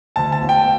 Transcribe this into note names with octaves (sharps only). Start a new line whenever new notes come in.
D2 A5
A5
E1
G5